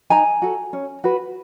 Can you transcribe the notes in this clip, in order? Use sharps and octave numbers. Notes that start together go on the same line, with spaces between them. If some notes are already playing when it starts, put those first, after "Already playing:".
D#4 G#5 A#5
F#4 A4
C#4
F#4 B4